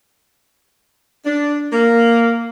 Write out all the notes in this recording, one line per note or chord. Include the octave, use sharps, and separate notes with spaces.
D4
A#3